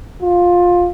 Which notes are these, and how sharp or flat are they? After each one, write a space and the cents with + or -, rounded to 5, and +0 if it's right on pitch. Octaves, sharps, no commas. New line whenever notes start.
F4 +15